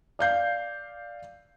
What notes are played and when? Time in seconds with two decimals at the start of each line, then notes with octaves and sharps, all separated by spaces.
0.19 D5 F5 G6 C7